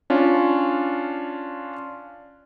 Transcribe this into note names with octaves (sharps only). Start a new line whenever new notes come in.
C#4 D4 F4